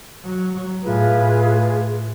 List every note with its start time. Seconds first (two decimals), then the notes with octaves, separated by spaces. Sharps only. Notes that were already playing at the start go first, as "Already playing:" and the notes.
0.24 F#3
0.84 A2 F4 G#4 B4